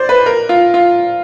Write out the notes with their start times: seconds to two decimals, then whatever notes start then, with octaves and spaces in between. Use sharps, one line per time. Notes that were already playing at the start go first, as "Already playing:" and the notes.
Already playing: C5 D5
0.09 B4
0.26 A#4
0.49 F4
0.74 F4